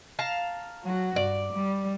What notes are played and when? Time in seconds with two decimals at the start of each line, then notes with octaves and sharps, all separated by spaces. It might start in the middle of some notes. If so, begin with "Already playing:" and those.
0.19 F5 A5 A#5
0.84 F#3 F#4
1.16 G2 D5
1.53 G3